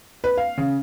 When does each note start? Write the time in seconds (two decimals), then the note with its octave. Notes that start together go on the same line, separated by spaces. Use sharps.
0.24 B4
0.37 F5
0.58 C#3